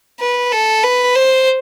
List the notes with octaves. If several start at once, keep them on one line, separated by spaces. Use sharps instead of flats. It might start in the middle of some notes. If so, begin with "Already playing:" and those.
B4
A4
B4
C5